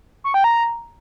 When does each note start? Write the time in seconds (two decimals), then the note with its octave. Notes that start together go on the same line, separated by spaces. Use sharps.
0.24 C#6
0.34 G5
0.44 A#5